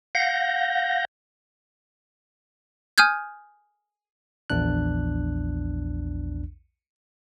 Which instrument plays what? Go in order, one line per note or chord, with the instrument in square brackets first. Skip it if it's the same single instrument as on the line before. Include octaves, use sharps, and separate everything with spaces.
[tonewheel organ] F5 F#5 G6 A#6
[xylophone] G#5 D#6 F6 G6 G#6
[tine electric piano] A#1 E2 D4 F#6